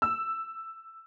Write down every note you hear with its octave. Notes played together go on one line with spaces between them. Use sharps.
E6